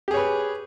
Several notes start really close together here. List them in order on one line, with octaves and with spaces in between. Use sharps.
G4 G#4 C#5 B4